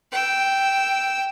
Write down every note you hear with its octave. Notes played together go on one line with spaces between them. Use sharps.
G5 E6